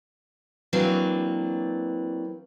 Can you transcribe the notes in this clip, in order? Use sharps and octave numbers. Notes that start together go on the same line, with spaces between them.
E3 F#3 A#3 C4 D4